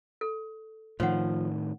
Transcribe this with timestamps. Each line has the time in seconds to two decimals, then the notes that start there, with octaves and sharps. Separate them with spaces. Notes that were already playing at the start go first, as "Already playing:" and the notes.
0.21 A4
1.00 A2 D#3 F3 C#5 F#5